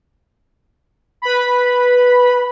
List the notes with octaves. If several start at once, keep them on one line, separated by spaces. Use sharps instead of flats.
B4 B5